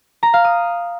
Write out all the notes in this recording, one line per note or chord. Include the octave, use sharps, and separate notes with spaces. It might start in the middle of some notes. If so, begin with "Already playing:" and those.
A#5
F5
D#6